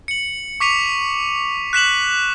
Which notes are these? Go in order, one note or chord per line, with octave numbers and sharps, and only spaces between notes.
C#7 F#7
C#6 D6 B6 C#7 D#7 F7
F#6 B6 E7 F#7